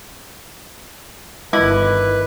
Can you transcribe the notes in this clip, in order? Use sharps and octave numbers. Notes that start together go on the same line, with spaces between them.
G1 D#3 E4 B4 D#5 D6 E6